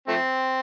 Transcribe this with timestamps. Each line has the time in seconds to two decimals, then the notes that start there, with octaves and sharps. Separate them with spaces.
0.08 F3 A3 C4